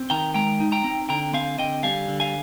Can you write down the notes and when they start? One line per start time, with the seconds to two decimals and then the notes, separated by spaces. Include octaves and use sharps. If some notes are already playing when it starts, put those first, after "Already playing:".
Already playing: C4
0.10 D#3 G5 A#5
0.34 G#3 G5 A#5
0.60 D#4
0.72 G5 A#5
0.84 C4
1.09 D3 G5 A#5
1.33 C4 F5 G#5
1.58 D3 D#5 G5
1.83 G3 F5 G#5
2.08 D3
2.20 F5 G#5